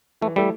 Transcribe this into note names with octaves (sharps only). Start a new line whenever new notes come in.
E3 A3
G3 A3 E4 A4